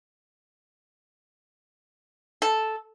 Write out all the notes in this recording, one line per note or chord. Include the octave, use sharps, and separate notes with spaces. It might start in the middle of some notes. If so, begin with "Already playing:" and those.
A4